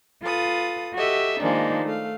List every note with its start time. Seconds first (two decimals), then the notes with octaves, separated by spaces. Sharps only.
0.22 F4 A4 B4 F5 D#6
0.95 F#4 G4 A4 D#5 E5
1.40 D#3 F3 G#3 A#3 D4 D#4
1.84 A3 F5